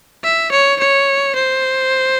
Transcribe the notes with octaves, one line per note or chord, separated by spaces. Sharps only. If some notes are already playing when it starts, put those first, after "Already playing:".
E5
C#5
C#5
C5